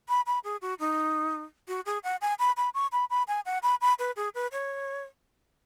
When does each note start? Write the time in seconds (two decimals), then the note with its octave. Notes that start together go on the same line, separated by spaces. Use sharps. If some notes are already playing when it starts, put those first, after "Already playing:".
0.09 B5
0.26 B5
0.44 G#4
0.62 F#4
0.79 D#4
1.68 F#4
1.86 G#4
2.04 F#5
2.21 G#5
2.39 B5
2.57 B5
2.74 C#6
2.92 B5
3.10 B5
3.28 G#5
3.46 F#5
3.63 B5
3.81 B5
3.99 B4
4.16 G#4
4.35 B4
4.52 C#5